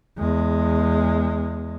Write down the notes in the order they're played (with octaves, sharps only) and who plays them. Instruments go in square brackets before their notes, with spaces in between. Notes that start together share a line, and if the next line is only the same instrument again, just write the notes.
[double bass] E2 G#3